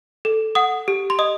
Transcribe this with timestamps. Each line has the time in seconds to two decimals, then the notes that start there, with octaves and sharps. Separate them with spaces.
0.25 A4
0.55 F#5 D#6
0.88 G4
1.10 C6
1.19 D#5 D#6